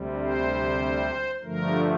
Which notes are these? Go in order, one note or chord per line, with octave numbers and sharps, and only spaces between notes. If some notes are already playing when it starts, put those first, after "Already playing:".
Already playing: D2 C3 G3
C5
G2 D3 F3 A3 A#4